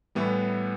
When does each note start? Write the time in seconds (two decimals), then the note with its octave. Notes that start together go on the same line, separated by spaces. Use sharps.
0.15 A2 E3 G3 B3